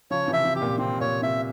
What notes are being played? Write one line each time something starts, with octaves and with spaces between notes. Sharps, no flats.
C#3 F3 C#5
C3 E3
E5
C3
G4
A#2
C3 C4
A#2 C#5
C3 E5